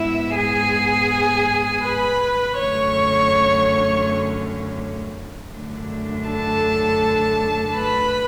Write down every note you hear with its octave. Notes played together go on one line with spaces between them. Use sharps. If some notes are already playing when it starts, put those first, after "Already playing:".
Already playing: G#2 G#3 B3 E4 E5
G#4 G#5
B4 B5
F#2 D3 A3 C#4 C#5 C#6
F#2 D3 A3 D4
A4 A5
B4 B5